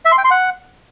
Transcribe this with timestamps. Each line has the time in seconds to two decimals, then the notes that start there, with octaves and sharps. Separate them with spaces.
0.05 E5
0.12 C6
0.18 G5
0.24 C6
0.31 F#5